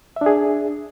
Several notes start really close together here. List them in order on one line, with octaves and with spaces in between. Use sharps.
E5 D4 G#4